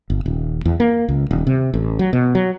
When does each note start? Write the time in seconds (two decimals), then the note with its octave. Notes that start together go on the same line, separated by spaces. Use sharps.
0.10 G1
0.26 D#1
0.65 E2
0.80 A#3
1.09 C#2
1.31 D#1
1.47 C3
1.74 A1
1.99 F#3
2.13 B2
2.35 F#3